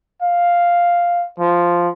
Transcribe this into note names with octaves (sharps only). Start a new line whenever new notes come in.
F5
F3